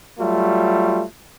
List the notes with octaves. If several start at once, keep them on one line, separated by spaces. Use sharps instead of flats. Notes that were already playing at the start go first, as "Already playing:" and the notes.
F#3 G3 A3 F4